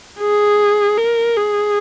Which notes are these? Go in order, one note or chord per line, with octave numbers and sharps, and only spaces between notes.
G#4
A#4
G#4